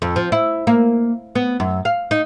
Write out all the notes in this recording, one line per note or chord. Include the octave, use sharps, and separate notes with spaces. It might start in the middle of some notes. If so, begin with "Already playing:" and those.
F2
F3
E4
A#3
B3
F#2
F5
D#4